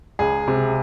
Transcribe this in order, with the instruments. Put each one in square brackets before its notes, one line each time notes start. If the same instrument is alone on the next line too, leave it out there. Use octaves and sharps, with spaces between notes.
[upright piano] C#2 G#4
C3